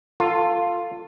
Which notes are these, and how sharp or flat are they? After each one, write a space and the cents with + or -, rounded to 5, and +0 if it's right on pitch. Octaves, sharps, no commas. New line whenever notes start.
F4 +0 A4 +20